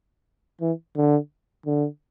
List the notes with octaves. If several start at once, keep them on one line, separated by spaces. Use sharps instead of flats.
E3
D3
D3